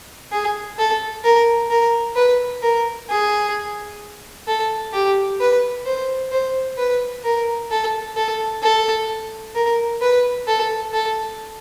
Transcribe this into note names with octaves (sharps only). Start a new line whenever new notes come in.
G#4
A4
A#4
A#4
B4
A#4
G#4
A4
G4
B4
C5
C5
B4
A#4
A4
A4
A4
A#4
B4
A4
A4